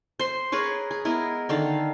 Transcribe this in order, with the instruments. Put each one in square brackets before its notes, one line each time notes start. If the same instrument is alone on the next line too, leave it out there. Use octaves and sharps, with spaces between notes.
[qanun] C5 C6
G#4 A#4 B4 C#5
G#4
G#3 B3 E4 A#4
D3 D#3 A4 F5